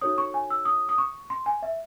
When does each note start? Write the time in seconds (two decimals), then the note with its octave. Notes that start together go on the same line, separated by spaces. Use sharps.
0.01 D#4 F#4 A4 C#5 D#6
0.18 C#6
0.34 G#5
0.50 E6
0.65 D#6
0.89 D#6
0.98 C#6
1.30 C6
1.46 G#5
1.63 E5